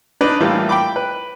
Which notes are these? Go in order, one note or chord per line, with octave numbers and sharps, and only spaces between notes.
D4 D#4 B4 D5
A2 E3 G3 A#3 F4
G5 B5 D6
B4